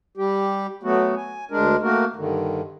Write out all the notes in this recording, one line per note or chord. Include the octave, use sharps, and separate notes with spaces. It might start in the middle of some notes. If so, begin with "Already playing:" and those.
G3 G4
F#3 A3 B3 F#4
G#5
D2 G#3 D4 A#4
A3 A#3 F#4 A#4
G2 D3 D#3